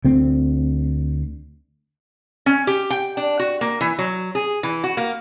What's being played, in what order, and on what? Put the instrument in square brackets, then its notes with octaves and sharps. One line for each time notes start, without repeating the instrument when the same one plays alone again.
[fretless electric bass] D2 C4
[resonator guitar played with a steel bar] C#4
G4
G5
D4
F#4
A#3
E3
F#3
G#4
E3
F#4
A#3